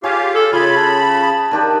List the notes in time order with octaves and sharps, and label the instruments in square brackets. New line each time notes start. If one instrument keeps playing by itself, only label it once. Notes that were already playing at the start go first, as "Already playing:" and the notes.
[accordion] F4 G4 F5 [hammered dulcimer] G#4 C#5
[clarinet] A4
[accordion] C#3 B5 [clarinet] F4 [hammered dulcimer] G#5
[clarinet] A5
[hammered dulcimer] D#3 D4 G4